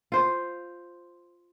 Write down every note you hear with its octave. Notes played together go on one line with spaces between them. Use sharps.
F4 C5